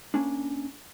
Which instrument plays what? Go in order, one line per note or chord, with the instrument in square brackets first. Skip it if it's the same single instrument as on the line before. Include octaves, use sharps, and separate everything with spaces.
[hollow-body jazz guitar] A#3 C#4 D4